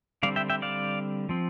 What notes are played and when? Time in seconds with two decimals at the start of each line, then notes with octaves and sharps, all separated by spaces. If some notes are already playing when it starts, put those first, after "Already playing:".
0.23 D3 G3 C4 D5 F5
0.36 E5 G5
0.50 E5 G5
0.62 D5 F5
1.29 F3 C4